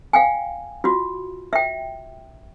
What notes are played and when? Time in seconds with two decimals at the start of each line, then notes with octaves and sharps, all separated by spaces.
0.13 F5 G5 G#5
0.84 F4 F#4
1.53 E5 G5